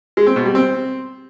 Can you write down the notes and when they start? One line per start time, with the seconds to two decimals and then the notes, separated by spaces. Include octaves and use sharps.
0.17 G#3
0.27 C4
0.36 B2
0.45 G3
0.55 C4